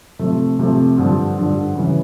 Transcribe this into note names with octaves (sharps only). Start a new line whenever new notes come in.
C3 F3 A3
C3 F3 A3
G2 D3 F3
G2 D3 F3
C#3 E3 G3